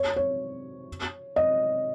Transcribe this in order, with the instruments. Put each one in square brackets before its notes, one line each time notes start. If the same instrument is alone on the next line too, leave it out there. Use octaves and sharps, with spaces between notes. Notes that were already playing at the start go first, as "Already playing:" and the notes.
Already playing: [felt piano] C#5
C#5
D#5